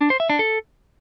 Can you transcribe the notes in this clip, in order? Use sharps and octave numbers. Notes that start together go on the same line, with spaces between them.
D4
C5
E5
D4
A4